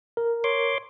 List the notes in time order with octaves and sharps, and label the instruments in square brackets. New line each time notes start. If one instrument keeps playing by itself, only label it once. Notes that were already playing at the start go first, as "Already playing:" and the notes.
[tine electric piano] A#4
[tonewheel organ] C#5 C6 D6